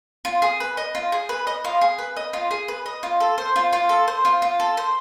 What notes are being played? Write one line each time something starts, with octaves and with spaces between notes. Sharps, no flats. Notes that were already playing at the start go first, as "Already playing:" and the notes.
F4
G#4
B4
D#5
F4
G#4
B4
D#5
F4
G#4
B4
D#5
F4
G#4
B4
D#5
F4
A4
C5
F4
F4
A4
C5
F4
F4
A4
C5